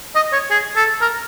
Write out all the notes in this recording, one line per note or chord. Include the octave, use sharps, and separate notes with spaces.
D#5
C#5
G#4
A4
A#4